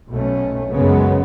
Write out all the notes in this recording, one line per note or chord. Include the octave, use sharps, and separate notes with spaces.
B1 B2 A3 C#4
F#2 C#3 G#3 B3